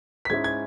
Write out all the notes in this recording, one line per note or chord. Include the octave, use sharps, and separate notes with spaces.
B6
G#2 G#3 C#4 E4 G#6
G#6